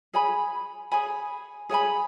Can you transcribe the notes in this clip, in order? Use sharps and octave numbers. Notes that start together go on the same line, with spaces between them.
G#4 C#5 G#5 B5
G#4 C#5 G#5 B5
G#4 C#5 G#5 B5